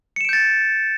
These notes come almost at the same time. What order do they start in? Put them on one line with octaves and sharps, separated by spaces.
C#7 E7 D7 G6 A6